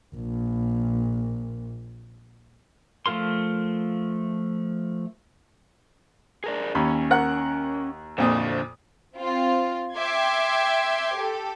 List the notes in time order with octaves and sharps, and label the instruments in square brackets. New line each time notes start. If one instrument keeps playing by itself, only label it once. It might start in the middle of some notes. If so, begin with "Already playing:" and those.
[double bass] A#1 A#2
[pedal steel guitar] F3 A3 F4 A#4 C6
[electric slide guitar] G#4 A#4 D5
[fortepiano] D#2 [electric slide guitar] C#4 [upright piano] B5
[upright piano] A#4 F#5 F#6
[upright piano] F2 A#2 D#6 [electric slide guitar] D3 C5
[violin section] C4 F4
E5 G5 C6 D6 G#6
G4 A4